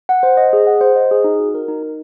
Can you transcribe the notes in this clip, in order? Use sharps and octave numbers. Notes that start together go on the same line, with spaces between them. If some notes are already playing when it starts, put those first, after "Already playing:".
F#5
C5
D#5
G#4
F#5
C5
D#5
G#4
D#4
F#4
A#4
D#4
D#4